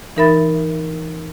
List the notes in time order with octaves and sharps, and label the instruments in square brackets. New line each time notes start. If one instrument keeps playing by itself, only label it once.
[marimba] E3 D#4 A#4 E5 B5 A6